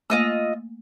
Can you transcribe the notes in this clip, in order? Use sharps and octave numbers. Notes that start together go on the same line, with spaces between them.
A3 A#3 F4 D#5 E6